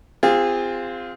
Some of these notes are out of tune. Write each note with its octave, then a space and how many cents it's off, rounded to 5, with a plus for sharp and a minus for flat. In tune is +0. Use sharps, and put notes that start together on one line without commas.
C4 -15 F4 +0 G#4 -35